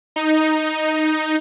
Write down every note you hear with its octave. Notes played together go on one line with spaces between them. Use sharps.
D#4